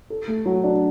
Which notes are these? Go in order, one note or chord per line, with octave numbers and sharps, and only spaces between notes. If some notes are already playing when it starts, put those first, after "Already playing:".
A4
A3
F#3
D4